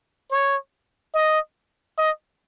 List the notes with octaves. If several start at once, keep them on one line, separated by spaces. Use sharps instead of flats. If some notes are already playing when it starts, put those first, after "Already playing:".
C#5
D#5
D#5